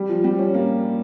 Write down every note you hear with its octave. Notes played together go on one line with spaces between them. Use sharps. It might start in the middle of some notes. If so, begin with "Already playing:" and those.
Already playing: G3
F3
G3
C#4
A#3